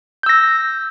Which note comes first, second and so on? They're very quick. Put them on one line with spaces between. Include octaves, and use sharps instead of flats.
G6 E6 A#6